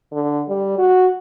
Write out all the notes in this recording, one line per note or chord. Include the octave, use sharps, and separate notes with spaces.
D3
G3
F#4